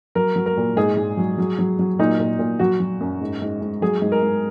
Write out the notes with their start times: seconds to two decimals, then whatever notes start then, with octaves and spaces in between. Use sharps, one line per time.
0.15 F#3 A#4
0.36 F#3
0.46 A#4
0.57 A#2
0.77 G#2 G#4
0.97 G#2
1.17 F#3
1.38 F#3
1.59 F#3
1.79 F#3
1.99 A#2 D#4
2.19 A#2
2.39 A#2
2.59 F#3 F#4
2.80 F#3
3.01 F#2
3.21 G#2
3.42 G#2
3.62 G#2
3.82 F#3 G#4
4.02 G#2
4.12 A#4
4.22 G#2